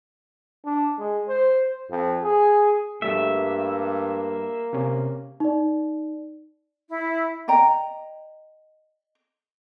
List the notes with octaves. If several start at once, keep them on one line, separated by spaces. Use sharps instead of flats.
D4
G#3
C5
F2
G#4
G2 G3 A3 A#3 E5
C3 C#4
D#4 D5
E4
D5 D#5 G5 A#5